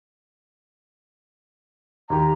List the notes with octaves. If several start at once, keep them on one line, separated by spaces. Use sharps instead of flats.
D#2 G4 A#5